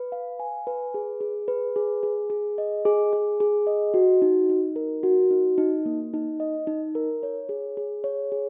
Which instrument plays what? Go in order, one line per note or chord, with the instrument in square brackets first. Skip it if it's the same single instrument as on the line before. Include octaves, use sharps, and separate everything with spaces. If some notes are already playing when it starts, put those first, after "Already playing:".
Already playing: [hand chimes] B4
F5
G#5
B4
G#4
G#4
B4
G#4
G#4
G#4
D#5
G#4
G#4
G#4
D#5
F#4
D#4
D#4
A#4
F#4
D#4
D#4
A#3
D#4
D#5
D#4
A#4
C#5
G#4
G#4
C#5
G#4